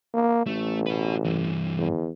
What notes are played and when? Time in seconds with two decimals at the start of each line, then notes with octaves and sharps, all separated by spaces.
0.14 A#3
0.46 A1 A3
0.86 F#4 B4
1.24 G2 E3
1.78 E2